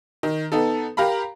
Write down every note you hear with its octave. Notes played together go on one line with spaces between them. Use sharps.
D#3
B3 D#4 A4
G4 A#4 F5 A#5 B5